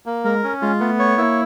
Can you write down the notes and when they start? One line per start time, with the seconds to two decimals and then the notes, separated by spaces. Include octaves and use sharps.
0.06 A#3
0.24 G#3 A#4
0.43 C#4
0.62 G#3 F4
0.80 A3 B3
0.99 C#5
1.18 A#3 E4